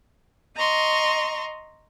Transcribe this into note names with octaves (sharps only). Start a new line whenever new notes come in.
D#5 A#5 C6 C#6